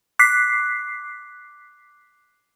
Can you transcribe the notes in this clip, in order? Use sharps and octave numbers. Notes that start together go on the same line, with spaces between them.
D6 F#6 B6 C7